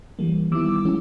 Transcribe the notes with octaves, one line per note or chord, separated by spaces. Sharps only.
E3 G3 A#3
D#3 G3 B3 E4 D6 E6
F3 G#3 C#4 E4